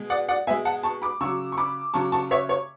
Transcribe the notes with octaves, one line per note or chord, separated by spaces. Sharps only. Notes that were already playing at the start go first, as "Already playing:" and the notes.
Already playing: B2 G#3
D5 F#5
D5 F#5
B2 G#3 E5 G#5
F#5 A5
A5 C#6
B5 D6
C#3 F#3 C#6 E6
C#6
B5 D6
C#3 F#3 A5 C#6
A5 C#6
C#5 E5
C#5